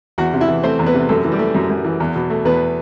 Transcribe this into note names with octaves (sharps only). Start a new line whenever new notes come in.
E2 F#4 F#5
C3
E4 E5
E3
A3 C4 C5
E2
B3 B4
C3
F#2 A3 A4
E3
G3 G4
A3
F#2
F#2
E3
E2
B2
A3
E2 B3 B4